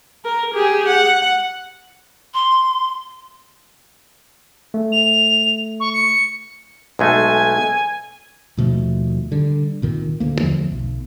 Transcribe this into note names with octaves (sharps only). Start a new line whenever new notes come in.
A#4
G4 G#4
F#5
C6
A3
F7
C#6
C#7
B1 G#3 A3 G#5
D#2 B2 F3 A3
D3 G3
C2 A#2 D#3
D2 A#3
E2 D3 F3 A3
B1